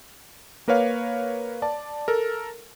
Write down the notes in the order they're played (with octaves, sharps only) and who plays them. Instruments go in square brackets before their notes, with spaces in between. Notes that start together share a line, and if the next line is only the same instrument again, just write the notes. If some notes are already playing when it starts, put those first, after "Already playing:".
[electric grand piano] A#3 A#4 B4 C#5 F5
D5 A5
A4 A#4